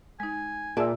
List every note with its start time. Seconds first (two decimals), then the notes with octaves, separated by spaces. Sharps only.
0.20 G#3 D#4 G#5
0.77 A#2 G#4 D5 E5 A5 E6